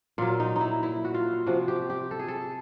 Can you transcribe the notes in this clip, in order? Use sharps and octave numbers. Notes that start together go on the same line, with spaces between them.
A#2 F#3 F4
D#4
D#4
E4
E4
F#4
F4
C3 F3 F#4
G4
G4
A4
G#4
A4